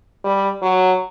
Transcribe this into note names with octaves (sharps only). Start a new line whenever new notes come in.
G3
F#3